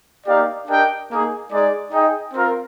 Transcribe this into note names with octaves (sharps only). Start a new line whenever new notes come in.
A#3 D#4 G4 D5 F5
D4 G4 A#4 D#5 G5
A#3 D#4 G#4
G#3 D#4 G#4 D5
D#4 G#4 D#5 G5
C4 F4 A#4